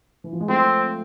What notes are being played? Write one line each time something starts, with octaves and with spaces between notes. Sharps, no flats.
E3
F3
G#3
F3 A3 C4